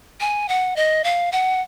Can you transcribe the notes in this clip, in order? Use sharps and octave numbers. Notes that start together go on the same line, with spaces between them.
G#5
F#5
D#5
F5
F#5